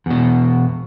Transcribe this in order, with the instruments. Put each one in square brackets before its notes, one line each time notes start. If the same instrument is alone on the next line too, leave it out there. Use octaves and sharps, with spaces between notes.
[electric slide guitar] E2 B2